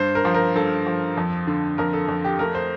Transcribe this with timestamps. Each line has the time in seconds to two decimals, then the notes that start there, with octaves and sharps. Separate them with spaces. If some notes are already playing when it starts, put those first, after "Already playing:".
Already playing: G2 C5
0.15 A#4
0.25 F3
0.34 A#4
0.55 G2 A4
0.87 F3
1.17 F2
1.47 D3
1.78 F2 A#4
1.93 A4
2.08 F2
2.24 G4
2.39 A3 A#4
2.55 C5